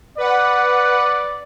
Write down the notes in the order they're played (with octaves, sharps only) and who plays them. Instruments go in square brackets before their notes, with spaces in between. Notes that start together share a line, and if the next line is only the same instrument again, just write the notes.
[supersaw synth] B4 F#5 [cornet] D5